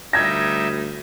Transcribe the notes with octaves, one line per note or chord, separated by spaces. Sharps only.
D2 G3 D#4 E5 G#6 A#6